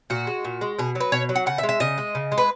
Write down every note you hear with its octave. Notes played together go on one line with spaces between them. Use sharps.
A#2 F#4
G#3
A#2
G#3
B2 G#4
F#3
B4
B2 C#5
F#3
F#5
C#3 F#5
E5
G#3
E5
C#3 D#5
G#3
C#3
G#3
B4